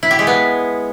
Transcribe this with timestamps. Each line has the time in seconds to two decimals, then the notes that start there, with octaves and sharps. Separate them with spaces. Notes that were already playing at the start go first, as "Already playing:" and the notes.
0.03 E4
0.11 G4
0.19 G#3
0.27 B3